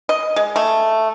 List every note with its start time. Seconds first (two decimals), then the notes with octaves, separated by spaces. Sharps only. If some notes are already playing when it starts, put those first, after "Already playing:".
0.09 D#5
0.36 G#3
0.56 A3